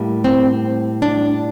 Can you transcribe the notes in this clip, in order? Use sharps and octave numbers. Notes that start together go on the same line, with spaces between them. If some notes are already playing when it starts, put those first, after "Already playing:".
Already playing: A2 G3 A#3
C4
D4